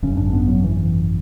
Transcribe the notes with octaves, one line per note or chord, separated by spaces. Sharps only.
G#1 F#2 C#3 C#4
D4
B3
F#3
E3